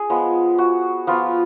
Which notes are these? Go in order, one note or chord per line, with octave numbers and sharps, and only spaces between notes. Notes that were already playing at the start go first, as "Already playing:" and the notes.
Already playing: G#4
F3 G#3 B3
F#4
F3 B3 F4